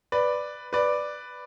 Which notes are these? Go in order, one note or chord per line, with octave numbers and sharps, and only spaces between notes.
B4 D5
B4 D5